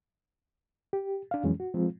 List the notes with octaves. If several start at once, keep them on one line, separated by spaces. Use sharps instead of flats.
G4
D4 F5
F2 E3 F#3 G#3 C#4
F#4
F3 G#3 C4 F4